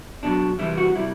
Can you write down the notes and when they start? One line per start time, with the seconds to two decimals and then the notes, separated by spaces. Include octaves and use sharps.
0.23 B2 F#3 D4
0.59 C3 E3 G3 E4
0.77 F#4
0.95 C3 G3 E4